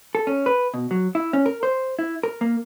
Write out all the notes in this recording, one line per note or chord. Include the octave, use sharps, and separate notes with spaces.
A4
C#4
B4
B2
F#3
E4
C#4
A#4
C5
E4
A#4
A#3